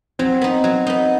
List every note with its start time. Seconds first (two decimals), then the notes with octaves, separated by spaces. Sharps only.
0.19 F#3 C4
0.42 B3 D#4
0.64 F#3
0.87 B3 D#4